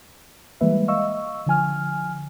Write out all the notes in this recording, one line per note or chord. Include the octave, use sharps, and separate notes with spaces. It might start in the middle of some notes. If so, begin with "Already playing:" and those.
E3 G3 G#3 A#3 B4 E5
D#5 F5 C#6 E6
D3 F3 G#5 F6